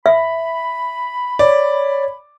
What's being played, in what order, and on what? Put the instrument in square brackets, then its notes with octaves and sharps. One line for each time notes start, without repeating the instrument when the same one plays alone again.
[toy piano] E5 [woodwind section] B5
[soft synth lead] C#5 [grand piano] D5